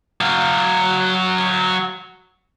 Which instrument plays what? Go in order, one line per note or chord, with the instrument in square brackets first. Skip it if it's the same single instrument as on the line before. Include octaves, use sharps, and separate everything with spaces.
[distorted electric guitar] F#3 F5